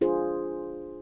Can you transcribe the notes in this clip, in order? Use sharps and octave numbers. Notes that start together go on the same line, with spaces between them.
D4 F4 G#4 C5